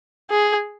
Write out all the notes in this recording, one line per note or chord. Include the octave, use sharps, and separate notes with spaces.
G#4